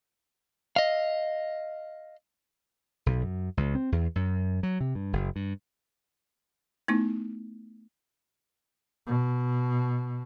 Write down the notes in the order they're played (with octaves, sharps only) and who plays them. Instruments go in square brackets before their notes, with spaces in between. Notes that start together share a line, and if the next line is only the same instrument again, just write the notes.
[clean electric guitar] D#5 F5
[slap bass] B1
F#2
C#2
C4
E2
F#2
F#3
C3
G2
F#1
G2
[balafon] A3 B3 D#4 E4
[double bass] B2